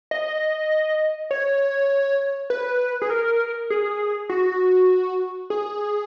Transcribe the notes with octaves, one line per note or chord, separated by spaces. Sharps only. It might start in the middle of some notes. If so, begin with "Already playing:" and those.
D#5
C#5
B4
G#4
A#4
G#4
F#4
G#4